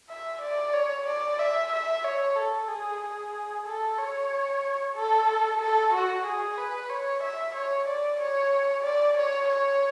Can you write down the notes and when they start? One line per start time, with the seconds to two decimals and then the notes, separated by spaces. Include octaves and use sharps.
0.09 E5
0.41 D5
0.73 C#5
1.06 D5
1.39 E5
1.72 E5
2.04 C#5
2.36 A4
2.68 G#4
3.01 G#4
3.66 A4
3.98 C#5
4.96 A4
5.61 A4
5.93 F#4
6.26 G#4
6.58 B4
6.90 C#5
7.23 E5
7.55 C#5
7.87 D5
8.20 C#5
8.84 D5
9.17 C#5
9.49 C#5